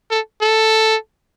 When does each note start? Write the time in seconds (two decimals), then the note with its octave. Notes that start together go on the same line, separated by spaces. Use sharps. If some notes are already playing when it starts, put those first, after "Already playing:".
0.11 A4
0.41 A4